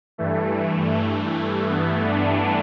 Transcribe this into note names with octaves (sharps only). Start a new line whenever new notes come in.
G2 E3 A3
A3
A3
B3
D4